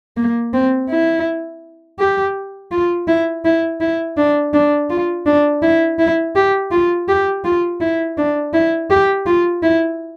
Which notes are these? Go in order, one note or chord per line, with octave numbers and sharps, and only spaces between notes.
A#3
C4
E4
G4
F4
E4
E4
E4
D4
D4
F4
D4
E4
E4
G4
F4
G4
F4
E4
D4
E4
G4
F4
E4